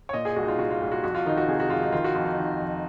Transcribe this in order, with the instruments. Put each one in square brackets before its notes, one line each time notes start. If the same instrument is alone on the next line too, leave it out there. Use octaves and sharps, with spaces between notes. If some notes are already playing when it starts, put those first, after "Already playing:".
[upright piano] C#5
A#2 D#5
G#4
C2 F#4
D#4
F4
A#2 F#4
F4
C2
F#4
F2 F#4
F4
D#3 D#4
F#4
C3 G#4
F#4
F2 F4
D#4
D#3 F4
F#4
F2 F4
D#4
D#3
F2